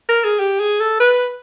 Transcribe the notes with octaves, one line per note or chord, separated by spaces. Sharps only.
A#4
G#4
G4
G#4
A4
B4